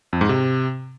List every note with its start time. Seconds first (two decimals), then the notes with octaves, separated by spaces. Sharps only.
0.13 F2
0.21 G#2
0.29 C3